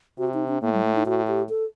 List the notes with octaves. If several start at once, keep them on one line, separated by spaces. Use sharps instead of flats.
C3 F#4
D#4
D4
A2 A#3
G3
A3
D#4
A2 F#4
G4
A4